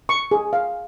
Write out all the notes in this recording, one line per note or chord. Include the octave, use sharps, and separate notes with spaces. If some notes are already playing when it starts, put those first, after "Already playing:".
C#6
G#4
F5